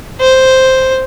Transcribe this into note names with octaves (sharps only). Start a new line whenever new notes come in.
C5